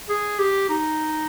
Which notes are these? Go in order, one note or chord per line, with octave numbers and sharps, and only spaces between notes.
G#4
G4
D#4